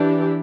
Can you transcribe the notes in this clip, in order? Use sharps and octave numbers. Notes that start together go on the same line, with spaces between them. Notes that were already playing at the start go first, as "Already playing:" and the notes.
Already playing: E3 D4 G4